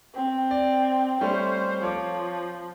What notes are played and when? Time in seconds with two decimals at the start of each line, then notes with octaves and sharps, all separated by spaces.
0.14 C4
0.51 D5
1.21 G3 A3 C#4 C5
1.83 F3 C#5 D6